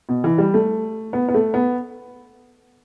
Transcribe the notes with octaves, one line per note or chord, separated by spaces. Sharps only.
B2
E3
G3
A3
B3
B3
A3
B3